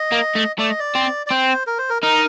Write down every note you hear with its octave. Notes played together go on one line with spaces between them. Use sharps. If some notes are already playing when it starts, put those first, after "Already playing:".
Already playing: D#5
A#3
A3
A3 D5
D#5
D5
C4
D5
C4 C5
A#4
C5
A#4
D#4 A#4